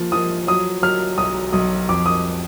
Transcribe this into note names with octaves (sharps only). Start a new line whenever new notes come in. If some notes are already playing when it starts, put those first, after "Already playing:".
Already playing: F3 A#3
F3 D#6
F#3 D#6
F#3 F6
B1 D#6
B1 D#6
F2 D6
D#6